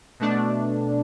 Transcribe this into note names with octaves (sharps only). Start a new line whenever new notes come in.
B2 A3 D4